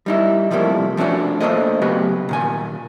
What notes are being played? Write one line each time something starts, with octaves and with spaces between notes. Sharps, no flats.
G3 D#4 E4
C3 F3 G3 A3 A#3 E4
F3 A3 B3 C#4 D4 F#4
A3 A#3 D4 A4 C5 D#5
C#3 F#3 B3 F#4 G4 B4
A#2 D#3 G#5